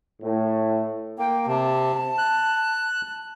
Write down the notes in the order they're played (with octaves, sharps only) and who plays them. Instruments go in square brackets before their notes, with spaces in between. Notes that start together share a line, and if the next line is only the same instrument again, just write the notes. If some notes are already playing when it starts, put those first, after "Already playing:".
[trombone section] A2
[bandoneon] A#3 [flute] G5
[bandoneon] C3 [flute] A5
[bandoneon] F#6